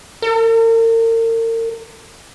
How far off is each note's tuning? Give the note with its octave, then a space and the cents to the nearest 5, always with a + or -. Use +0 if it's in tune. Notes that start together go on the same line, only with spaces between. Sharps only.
A#4 -40